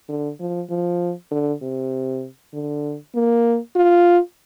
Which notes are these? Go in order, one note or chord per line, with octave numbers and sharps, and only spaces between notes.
D3
F3
F3
D3
C3
D3
A#3
F4